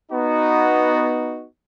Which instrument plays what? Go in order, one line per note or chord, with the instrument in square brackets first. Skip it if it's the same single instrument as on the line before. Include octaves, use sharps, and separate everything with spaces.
[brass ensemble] B3 D#4 F#4